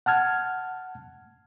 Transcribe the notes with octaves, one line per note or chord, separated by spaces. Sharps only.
F#5 A5 F6 G#6